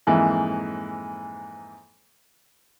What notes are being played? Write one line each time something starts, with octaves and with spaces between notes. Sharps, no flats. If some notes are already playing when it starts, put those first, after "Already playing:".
F2 G#2 E3 A#3